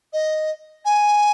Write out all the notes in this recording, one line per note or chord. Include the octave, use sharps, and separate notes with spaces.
D#5
G#5